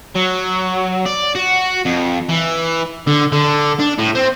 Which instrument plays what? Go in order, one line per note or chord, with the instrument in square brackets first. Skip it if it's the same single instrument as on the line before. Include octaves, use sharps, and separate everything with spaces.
[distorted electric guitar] F#3
D5
F#4
F2
E3
D3
D3
D4
A2
C4